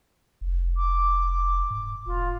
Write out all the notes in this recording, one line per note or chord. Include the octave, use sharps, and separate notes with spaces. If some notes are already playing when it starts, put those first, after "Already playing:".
F1
D6
G#2
E1 F4